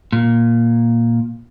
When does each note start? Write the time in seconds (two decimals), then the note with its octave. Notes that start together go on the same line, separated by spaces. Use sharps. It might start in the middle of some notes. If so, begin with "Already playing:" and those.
0.12 A#2